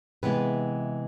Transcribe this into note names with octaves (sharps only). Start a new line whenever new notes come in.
C3 E3 G#3 B3 B4